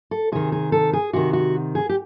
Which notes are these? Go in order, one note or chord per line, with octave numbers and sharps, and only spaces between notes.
A4
C3 D#3 G#4
G#4
A4
G#4
C3 D#3 F#4
F#4
G#4
G4